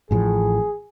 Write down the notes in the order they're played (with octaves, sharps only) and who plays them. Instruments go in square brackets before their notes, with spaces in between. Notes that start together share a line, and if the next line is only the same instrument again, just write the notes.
[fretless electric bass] A1 A2 F3 [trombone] G#4